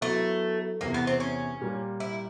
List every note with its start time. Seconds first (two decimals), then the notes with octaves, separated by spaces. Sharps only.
0.01 F#3 A3 B3 E4
0.81 E2 C3 E3 A#3
0.94 B3
1.07 C4
1.20 C#4
1.61 A#2 G3 A#3
2.00 E4